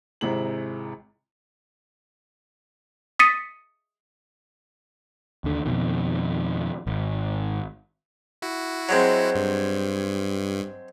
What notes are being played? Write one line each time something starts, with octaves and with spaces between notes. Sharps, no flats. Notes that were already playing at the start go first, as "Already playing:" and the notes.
G#1 C3 G#3 E4 A#5 F#7
D#6 A6 B6 C#7 D#7
D#2 D3
F2 B2 D#3
G#1
E4 F#4
F#3 G#3 C4
G2